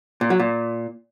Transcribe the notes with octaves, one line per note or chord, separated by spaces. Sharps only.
A#2
F#3
A#2